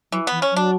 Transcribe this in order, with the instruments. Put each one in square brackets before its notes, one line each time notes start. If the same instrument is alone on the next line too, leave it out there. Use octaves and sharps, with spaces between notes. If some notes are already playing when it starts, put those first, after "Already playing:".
[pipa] E3 [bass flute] F#3
[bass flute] E3 [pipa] B3
[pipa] C#4
[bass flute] F#3 [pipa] D4